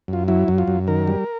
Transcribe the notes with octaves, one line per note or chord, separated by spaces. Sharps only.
F#2 F4
F#3 E4
F#2
F4
F#2
D#3 A#4
G3